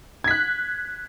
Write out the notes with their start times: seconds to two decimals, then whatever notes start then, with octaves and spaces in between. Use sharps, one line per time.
0.24 G#6
0.28 B6
0.31 F#6